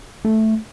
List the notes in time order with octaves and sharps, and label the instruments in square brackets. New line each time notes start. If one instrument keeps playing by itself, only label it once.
[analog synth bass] A3